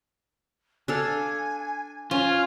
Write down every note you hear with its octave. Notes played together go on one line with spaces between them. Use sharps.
D4 A4 F5 G#5
C#4 F4 G#5